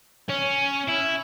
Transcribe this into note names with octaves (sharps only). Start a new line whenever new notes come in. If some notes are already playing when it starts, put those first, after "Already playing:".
C#4
E4